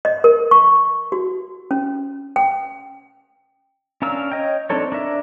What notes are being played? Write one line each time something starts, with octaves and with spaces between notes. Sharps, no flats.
D#5
A#4
C#6
F#4
C#4
G5
C#4 D4 A#4 F5 E6
C#5 D#5 G5
C4 D4 D#4 A4 C#5
D4 A#4 E5